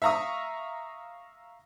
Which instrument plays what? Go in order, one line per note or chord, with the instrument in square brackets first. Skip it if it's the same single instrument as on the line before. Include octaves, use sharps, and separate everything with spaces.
[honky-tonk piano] E5 F5 A#5 C#6 D#6